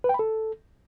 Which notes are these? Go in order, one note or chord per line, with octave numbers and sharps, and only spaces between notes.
B4
G5
B5
A4